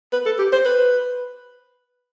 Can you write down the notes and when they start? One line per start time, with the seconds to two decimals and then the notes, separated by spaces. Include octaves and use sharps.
0.13 B4
0.26 A4
0.39 G4
0.53 C5
0.65 B4